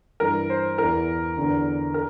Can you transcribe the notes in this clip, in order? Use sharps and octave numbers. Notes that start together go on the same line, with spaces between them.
G2 E3 A#4
C5
E2 E3 A#4
E2 D3
A#4